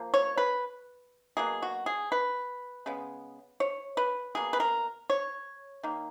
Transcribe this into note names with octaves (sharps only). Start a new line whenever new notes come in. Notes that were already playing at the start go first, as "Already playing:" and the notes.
Already playing: F3 A#3
C#5
B4
B2 F#3 A#3 G#4
F#4
G#4
B4
C#3 G#3 B3
C#5
B4
B2 A#3 G#4
B4
A#4
C#5
D#3 A#3